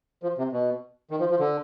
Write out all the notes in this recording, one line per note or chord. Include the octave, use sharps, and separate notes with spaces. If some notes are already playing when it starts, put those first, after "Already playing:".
F3
C3
B2
D#3
F3
F3
D3